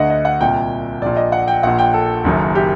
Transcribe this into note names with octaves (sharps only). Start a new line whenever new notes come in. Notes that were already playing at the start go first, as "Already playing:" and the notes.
Already playing: D2 D3 D#5 F#5
D#5
F#5
C2 A#2 G5
A#1 A#2 D5
D#5
F#5
G5
A#1 A#2 F#5
G5
A4
F#1 F#2 D#3
G4